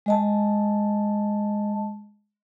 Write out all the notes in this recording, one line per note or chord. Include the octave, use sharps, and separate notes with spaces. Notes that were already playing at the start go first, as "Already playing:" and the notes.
G#3 D#5 A5